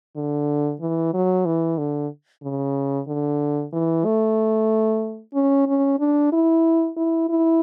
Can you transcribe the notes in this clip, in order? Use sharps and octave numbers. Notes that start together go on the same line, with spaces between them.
D3
E3
F#3
E3
D3
C#3
D3
E3
A3
C#4
C#4
D4
E4
E4
E4